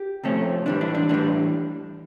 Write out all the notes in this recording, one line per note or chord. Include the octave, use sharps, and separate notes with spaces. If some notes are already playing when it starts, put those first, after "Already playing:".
Already playing: G4
C3 F3 A3 C#4
A2 E3 G3 D4
D4
D4
A2 E3 G3 D4